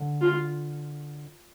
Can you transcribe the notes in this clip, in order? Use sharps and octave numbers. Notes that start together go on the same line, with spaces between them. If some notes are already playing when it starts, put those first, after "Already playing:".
Already playing: D3
F4